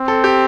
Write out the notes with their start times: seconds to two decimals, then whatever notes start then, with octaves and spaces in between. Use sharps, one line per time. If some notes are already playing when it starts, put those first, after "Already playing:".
Already playing: C4
0.08 A4
0.24 G4